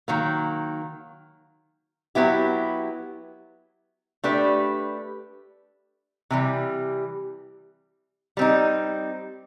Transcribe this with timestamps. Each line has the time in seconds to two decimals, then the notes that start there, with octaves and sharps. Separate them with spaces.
0.08 D#3 F#3 A#3
2.15 F#3 B3 E4 G4
4.24 A3 D4 G4 B4
6.30 C3 E3 G3
8.37 G3 C4 D#4